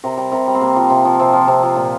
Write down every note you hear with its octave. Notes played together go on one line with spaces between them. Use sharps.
C3 A#4
G3
C3 A#4
G3
C4
C3 A#3
F3
C3
F3
C3 C4
F3
C3
F3
A#2